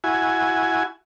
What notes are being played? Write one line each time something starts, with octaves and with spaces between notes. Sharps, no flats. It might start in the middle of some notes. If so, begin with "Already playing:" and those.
E4 F#4 G#5